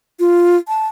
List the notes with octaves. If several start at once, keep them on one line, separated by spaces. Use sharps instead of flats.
F4
A5